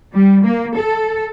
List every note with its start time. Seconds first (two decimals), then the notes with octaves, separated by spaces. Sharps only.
0.12 G3
0.44 A#3
0.75 A4